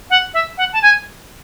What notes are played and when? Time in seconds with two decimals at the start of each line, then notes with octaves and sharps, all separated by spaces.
0.10 F#5
0.34 E5
0.58 F#5
0.73 A5
0.82 G#5